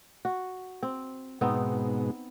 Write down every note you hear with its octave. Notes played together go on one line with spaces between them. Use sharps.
F#4
C4
G#2 B2 B3 C4 D#4